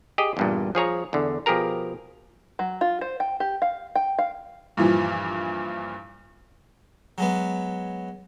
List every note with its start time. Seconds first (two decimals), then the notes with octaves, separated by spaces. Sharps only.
0.18 G4 G#4 D#5
0.37 E2 G2 A#2
0.75 F3 G#4 C#5 A#5
1.13 E2 D3
1.46 B2 F3 G4 G#4 A#4 A#5
2.59 F#3
2.81 F4
3.01 C5
3.20 G5
3.40 G4
3.62 F5
3.95 G5
4.18 F5
4.77 G2 A#2 E3 F3
7.18 F#3 G#3 B3